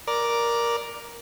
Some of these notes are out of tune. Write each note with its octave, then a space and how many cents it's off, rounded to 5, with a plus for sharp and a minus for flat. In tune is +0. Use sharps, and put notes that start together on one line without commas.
A#4 +10 D5 +0